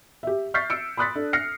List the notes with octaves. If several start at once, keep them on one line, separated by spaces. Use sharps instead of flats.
G4 E5
C#6 F6 G6 A6 B6 C7
E6 C#7 D7
B5 C6 D#6 F#6 A6 B6
D4 A4
F6 A#6 C7 C#7